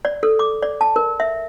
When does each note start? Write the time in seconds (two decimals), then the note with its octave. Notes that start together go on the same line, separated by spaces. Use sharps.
0.05 D5
0.23 A4
0.39 D6
0.62 D5
0.81 A5
0.96 A#4
1.20 E5